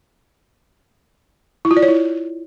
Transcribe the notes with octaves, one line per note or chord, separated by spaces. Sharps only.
E4
F4
D5
C#5
E4